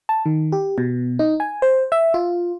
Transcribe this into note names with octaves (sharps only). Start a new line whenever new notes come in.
A5
D#3
G4
B2
D#4
G#5
C5
E5
F4